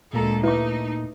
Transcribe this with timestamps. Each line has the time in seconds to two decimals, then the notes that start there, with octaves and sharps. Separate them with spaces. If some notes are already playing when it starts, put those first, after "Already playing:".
0.13 D2 A#2 G#3 A#3 A4 A#5
0.44 A3 D#4 E4 B4 D6